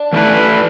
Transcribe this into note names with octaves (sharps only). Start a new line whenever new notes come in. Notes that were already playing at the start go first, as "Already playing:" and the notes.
Already playing: D4
E3 A3 E4 B4